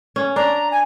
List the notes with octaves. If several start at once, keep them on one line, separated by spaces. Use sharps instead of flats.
C#4
D4 A#5
G#5